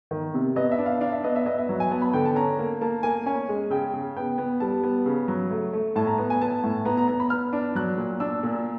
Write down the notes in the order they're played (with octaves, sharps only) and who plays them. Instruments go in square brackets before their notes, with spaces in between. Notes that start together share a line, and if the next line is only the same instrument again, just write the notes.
[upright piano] D#3
C3
B3 D#5
E5
D4
F5
D4 F5
E5
B3 D#5
E5
B3 D#5
E5
F#3
G#5
B3 A5
B5
D3 G5
A5
C#4 A#5
A#3
A#3 A5
A#3 G#5
C#4 G#5
G#3
C#3 G5
C#3
B3 G5
B3
G3 A5
B3
C#3
F#3
A3
A3
A2 A5
A#5
B3
G#5
B3 A5
A2
B3 A#5
A#5
B3 A#5
B5
B3 F6
D4
F#3 F#6
A#2
D4 E6
A#2